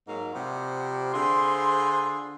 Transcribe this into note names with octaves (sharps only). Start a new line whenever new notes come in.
G#2 F#3 A#3
C3 F3 G3 F#5
D3 F4 G#4 C5 B5 C6